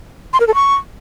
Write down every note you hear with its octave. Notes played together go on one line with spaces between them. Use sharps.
C6
A#4
A4
C#6